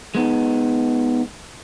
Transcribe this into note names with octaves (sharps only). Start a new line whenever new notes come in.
G#3 B3 D#4